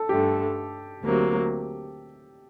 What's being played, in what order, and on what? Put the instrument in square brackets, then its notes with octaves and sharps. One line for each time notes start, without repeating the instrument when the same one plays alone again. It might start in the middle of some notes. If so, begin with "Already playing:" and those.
Already playing: [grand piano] A4
[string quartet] G2 D3 A3 [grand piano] G4
[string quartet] D2 C3 F#3 A#3